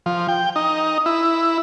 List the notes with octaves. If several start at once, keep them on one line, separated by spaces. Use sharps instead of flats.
F3
G5
D#4
E4